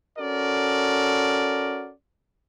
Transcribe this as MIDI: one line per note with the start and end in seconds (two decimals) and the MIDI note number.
0.19 1.92 61
0.19 1.92 66
0.19 1.92 69
0.19 1.92 70
0.19 1.92 74